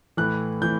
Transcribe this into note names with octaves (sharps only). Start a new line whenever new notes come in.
A2 E3 F#6
A2 E3 G6